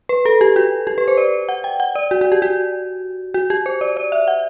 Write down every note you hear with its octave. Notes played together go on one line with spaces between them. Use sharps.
B4
A4
G4
F#4
G4
B4
C5
D5
F#5
G5
F#5
D5
F#4
F#4
G4
F#4
F#4
G4
C5
D5
D5
E5
F#5